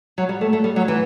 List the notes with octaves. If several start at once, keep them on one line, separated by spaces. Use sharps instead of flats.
F#3
G3
A3
A3
G3
F#3
E3